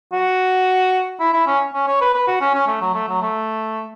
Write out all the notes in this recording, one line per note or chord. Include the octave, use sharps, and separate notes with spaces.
F#4
E4
E4
C#4
C#4
C#5
B4
B4
F#4
C#4
C#4
A3
F#3
A3
F#3
A3